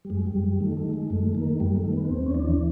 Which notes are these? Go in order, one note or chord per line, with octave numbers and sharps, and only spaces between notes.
G3
F#2 G#3
G3
F#2
G3
D#3 A3
A3
D#3
G#3
F#2 A3
D#3 A#3
F#2 G3
A3
D#3
B3
D#2 C4
C#4
E3 D4